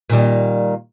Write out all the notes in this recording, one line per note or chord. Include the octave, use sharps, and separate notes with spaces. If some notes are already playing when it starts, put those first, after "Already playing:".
A#2 D#3 G3